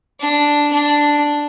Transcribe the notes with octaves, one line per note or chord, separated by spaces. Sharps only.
D4
D4